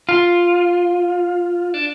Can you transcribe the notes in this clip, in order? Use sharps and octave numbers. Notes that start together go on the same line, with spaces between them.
F4
D4